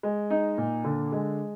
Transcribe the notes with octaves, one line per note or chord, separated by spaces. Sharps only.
G#3
D#4
A#2
D3
G#3